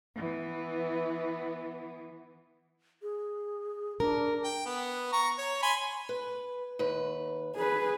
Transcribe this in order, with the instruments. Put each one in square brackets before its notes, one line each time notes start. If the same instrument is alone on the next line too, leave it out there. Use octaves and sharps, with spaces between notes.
[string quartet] E3 B3
[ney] G#4
[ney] D4 [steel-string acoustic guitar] A#4
[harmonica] G5
B3
A#5 C#6
C#5
G#5 B5 C6
[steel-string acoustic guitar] B4
D#2 B4
[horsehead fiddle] G#4 B4